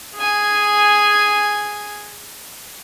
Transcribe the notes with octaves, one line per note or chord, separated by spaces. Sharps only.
G#4 G#5